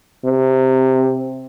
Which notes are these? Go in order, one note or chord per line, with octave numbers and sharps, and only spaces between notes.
C3